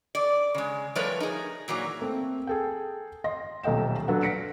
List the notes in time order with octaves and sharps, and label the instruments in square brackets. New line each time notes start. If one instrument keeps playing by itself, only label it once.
[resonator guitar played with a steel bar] D5
C#3 G#3
F3 G3 A3 A#4 B4 C#5
D#4 G#4
A#2 E3 F#3 A#3
[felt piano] A3 A#3 C4
G#4 A4 G5
D#5 C6 A#6
D#1 B1 A3 D#5 G5 E7
F#3 D4 A4 B4 F#5
A#6 B6 C#7 D7